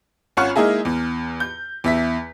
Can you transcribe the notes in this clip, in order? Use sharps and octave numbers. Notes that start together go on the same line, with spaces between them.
G#1 C#4 F4 F#5 C#6 F6
G#3 A#3 D#4 E4 G#4
E2
G6
E2 E5 B6